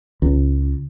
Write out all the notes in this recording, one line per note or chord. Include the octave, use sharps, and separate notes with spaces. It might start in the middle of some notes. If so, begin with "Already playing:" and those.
C#2